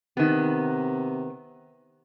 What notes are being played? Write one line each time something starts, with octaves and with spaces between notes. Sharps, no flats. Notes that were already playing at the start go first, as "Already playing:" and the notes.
C3 D#3 B3